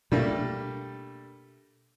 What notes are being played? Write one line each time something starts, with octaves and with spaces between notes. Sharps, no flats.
B2 G3 A3 A#3 D4